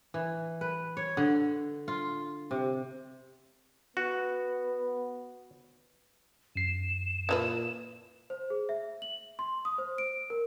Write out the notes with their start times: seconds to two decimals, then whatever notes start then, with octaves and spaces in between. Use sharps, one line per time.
0.14 E3
0.61 B4
0.97 C#5
1.17 D3
1.88 F4
2.51 C3
3.97 B3 F#4
6.56 F#2 C7 E7
7.29 A#2 E3 D#4 B4
8.30 C5
8.50 G#4
8.69 E5
9.02 F#7
9.39 C6
9.65 D#6
9.78 C5
9.98 D7
10.30 A#4